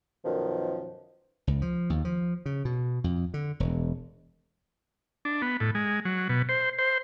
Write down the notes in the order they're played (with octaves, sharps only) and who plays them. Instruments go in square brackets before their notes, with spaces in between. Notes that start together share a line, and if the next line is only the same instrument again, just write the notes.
[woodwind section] F#2 B2 D#3 F3
[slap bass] C#2
F3
D#2
F3
C#3
B2
F2
D3
E1
[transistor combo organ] D4
B3
A2
G#3
F#3
B2
C5
C5